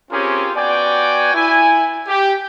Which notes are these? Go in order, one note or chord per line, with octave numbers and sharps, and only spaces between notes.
C4 C#4 F4 G4 G#4 A#4
B3 F#4 D5 G5 G#5
E4 G#5
G4